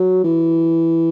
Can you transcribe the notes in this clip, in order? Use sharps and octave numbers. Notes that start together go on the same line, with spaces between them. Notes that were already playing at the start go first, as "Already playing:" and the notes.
Already playing: F#3
E3